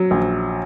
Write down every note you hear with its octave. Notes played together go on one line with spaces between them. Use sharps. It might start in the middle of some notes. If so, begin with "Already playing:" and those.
Already playing: F#3
A#1